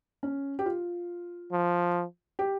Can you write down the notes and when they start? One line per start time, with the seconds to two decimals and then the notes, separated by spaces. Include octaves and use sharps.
0.23 C#4
0.59 G4
0.66 F4
1.52 F3
2.39 G4